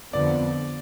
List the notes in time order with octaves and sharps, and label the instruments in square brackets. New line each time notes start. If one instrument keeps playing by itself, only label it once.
[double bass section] F2 D3 F3 B3 [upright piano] D5